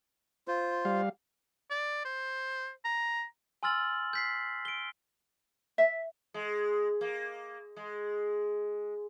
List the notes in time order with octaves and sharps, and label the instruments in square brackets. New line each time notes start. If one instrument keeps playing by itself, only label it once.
[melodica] F4 C5
[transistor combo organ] G3 F5
[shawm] D5
C5
A#5
[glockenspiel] G#5 C6 E6 F6 A6 F#7
G6 B6 C7
D7 G7
[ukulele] E5
[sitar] G#3
A#3
G#3